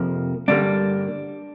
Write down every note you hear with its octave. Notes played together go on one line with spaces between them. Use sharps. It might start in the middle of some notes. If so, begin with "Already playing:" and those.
Already playing: F2 C3 F3 A#3
G2 D3 G3 A#3 D4